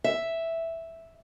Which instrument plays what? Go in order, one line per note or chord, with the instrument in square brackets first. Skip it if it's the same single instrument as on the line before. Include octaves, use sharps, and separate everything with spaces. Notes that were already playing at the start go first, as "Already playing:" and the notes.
[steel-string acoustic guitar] E5